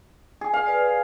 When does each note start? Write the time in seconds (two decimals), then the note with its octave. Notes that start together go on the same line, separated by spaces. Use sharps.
0.41 G#4
0.54 F5
0.67 B4 D5